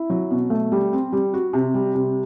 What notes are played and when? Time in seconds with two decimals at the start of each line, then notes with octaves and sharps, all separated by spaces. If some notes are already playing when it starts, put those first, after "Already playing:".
Already playing: E4
0.10 F#3
0.31 B2
0.50 A3
0.72 G3
0.93 C4
1.13 G3
1.34 F#4
1.53 C3
1.74 G3
1.95 C3